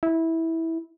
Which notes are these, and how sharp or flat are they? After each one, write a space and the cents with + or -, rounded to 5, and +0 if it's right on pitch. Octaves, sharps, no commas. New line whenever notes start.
E4 -15